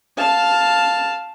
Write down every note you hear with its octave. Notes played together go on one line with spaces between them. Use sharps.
F5 A5